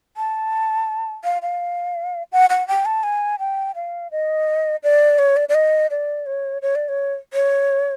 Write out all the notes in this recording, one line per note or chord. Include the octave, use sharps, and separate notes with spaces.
A5
F5
F5
F#5
F#5
G5
A5
G#5
G5
F5
D#5
D5
C#5
D5
D5
D#5
D5
C#5
C#5
D5
C#5
C#5